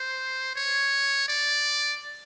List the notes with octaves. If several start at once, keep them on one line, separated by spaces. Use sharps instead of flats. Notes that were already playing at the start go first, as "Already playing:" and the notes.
Already playing: C5
C#5
D5